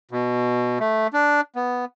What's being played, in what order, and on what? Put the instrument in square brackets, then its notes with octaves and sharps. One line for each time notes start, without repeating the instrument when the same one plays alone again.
[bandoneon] B2
A3
D4
B3